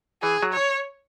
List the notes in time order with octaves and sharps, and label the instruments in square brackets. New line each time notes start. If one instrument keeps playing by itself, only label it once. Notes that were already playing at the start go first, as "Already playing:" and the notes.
[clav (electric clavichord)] E3 [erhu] G#4
[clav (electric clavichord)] F#3
[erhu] C#5